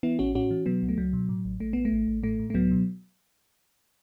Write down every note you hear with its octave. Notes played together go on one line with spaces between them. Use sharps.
E3 B3 E4
A1 C#4 F#4
A2 C#4 F#4
E3
B2 F#3 B3
C#2
A3
C#2 F#3
B2
A2
A1
A1 A3
A1 B3
A3
A1
A1
A2 A3
A2
A3
C#2 F#3 B3
B2